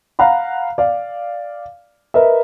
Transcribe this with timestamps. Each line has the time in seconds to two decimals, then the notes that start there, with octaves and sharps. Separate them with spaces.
0.19 F5 F#5 A#5 B5
0.78 D5 F5
2.14 A#4 B4 D#5 E5